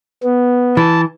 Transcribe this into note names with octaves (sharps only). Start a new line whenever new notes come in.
B3
E3 A5